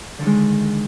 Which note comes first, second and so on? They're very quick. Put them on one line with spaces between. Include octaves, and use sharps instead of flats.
D3 D#3 G#3